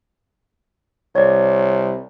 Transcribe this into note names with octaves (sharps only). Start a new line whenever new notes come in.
C2 C#5 D5